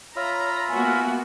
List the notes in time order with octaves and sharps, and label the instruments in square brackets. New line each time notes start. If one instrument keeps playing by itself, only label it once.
[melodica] F4 E5 B5 [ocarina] C#5 [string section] A#5
[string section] A#3 B3 F#4 [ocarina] G#5